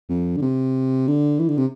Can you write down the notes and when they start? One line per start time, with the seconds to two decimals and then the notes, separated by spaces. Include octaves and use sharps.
0.09 F2
0.37 D3
0.42 C3
1.07 D3
1.39 E3
1.49 D3
1.57 C3